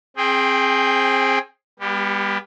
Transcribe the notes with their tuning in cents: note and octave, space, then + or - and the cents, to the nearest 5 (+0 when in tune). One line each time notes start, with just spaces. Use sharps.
C4 +25 G#4 +0 G5 +0
G3 +40 B3 -15 G4 -5